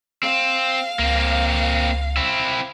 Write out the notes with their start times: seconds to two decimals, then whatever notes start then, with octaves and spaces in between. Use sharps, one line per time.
0.23 C4 F5
0.99 C#2 A#3 C4
2.17 C4 E4